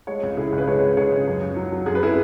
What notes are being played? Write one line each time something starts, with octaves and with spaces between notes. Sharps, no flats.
G#3 G#4 C#5
C#2
C#3 E4 G#4
C#2
B4
G#3 G#4 C#5
C#2
C#3 G#4 C#5
C#2
F#2
F#2
F#3
F#3
F#2 G#4
B4
E4 G#4